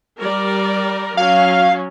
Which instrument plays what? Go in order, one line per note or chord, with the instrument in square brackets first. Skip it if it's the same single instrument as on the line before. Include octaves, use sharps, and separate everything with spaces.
[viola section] G3 A#4 D5
[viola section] F#3 C#4 [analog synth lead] F5